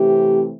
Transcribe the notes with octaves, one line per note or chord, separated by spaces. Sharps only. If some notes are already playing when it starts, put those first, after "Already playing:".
Already playing: C3 E3 A3 C4 G4